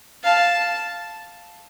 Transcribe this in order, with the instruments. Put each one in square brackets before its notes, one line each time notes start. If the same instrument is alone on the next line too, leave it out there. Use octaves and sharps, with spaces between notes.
[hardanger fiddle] F5 [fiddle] A5